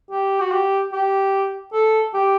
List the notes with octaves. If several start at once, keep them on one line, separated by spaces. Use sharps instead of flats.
G4
F#4
G4
G4
A4
G4